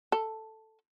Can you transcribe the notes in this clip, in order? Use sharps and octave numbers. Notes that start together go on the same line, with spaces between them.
A4